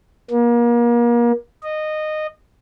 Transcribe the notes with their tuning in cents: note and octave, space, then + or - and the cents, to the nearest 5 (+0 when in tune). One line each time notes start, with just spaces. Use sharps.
A#3 +35
D#5 -15